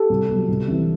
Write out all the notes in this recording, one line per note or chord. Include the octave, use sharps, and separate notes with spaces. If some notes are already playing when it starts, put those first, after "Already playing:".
Already playing: G4 A4
C2
B2
F#3
C2
C3 E3